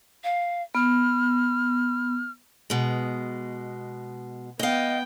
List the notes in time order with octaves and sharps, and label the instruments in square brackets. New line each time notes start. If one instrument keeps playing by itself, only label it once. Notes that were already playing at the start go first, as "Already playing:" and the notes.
[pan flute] F5
[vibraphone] B3 [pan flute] F6
[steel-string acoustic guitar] B2 G#3
[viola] B3 G5 [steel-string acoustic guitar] D#5 F5